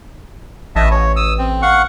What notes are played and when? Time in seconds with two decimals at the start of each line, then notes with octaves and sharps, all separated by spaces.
0.76 A1 D#5 E5 A5
0.91 C#5
1.16 D#6 E6
1.38 C4
1.62 F5 F#5 C#6